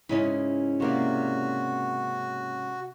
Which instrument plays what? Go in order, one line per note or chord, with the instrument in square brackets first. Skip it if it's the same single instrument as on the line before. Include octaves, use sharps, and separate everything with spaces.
[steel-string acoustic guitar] G#2 C#3 C#4 [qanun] E4
[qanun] C3 A#3 D5 [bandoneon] F#4